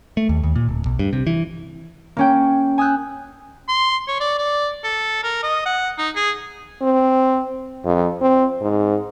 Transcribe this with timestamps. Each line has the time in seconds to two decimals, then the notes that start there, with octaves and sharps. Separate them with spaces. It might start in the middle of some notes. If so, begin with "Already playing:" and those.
0.17 A3
0.29 D#2
0.44 D#2
0.56 A#2
0.69 D1
0.86 B1
0.99 G2
1.13 C3
1.27 E3
2.17 A#3 C#4 G5
2.78 G#5 D#6 E6 F#6 G6
3.69 C6
4.08 C#5
4.20 D5
4.38 D5
4.84 A4
5.23 A#4
5.43 D#5
5.66 F#5
5.98 D#4
6.16 G#4
6.82 C4
7.85 F2
8.21 C4
8.61 G#2